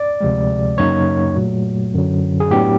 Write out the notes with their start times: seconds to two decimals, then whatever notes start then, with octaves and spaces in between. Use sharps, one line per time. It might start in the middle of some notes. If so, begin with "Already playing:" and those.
Already playing: D5
0.21 D2 C3 F3 G#3
0.78 F#2 C#3 F#3 A#3 D#4 C#5
1.36 A#2 F#3 A3
1.94 F#2 D3 F#3
2.40 G#4
2.50 A2 F#3 B3 D4 G4